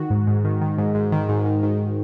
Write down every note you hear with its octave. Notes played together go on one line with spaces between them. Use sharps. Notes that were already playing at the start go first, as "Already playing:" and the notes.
Already playing: D#3 F#4
G#2
G#2
D#3
D#3
G#2
G#2
D#3
G#2
D#3
D#3